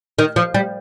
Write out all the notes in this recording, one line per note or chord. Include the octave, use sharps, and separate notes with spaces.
D#3
F3
G3